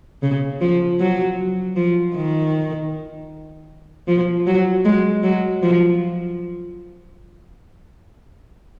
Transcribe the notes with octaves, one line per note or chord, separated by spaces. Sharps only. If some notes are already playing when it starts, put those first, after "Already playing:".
C#3
F3
F#3
F3
D#3
F3
F#3
G#3
F#3
F3